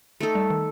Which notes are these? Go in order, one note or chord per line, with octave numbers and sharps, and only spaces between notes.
A3 D#4 A4
G3
D#3